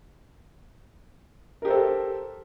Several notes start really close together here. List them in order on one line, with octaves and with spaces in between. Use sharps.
A#4 G4 C5 A4